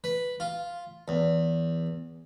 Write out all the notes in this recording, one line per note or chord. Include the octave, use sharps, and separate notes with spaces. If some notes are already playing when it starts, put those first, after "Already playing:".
B4
F4
E2